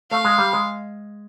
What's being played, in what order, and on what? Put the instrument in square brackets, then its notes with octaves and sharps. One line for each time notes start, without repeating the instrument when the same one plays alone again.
[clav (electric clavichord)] A3 [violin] F5
[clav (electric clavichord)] G#3
G3
G#3